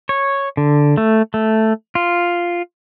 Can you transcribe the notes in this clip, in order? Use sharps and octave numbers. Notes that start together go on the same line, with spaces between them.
C#5
D3
A3
A3
F4